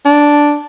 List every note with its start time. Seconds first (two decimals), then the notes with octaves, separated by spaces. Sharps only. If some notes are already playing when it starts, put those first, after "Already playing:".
0.05 D4